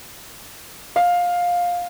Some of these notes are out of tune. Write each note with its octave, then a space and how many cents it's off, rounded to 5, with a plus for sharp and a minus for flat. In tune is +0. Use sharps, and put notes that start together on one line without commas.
F5 +15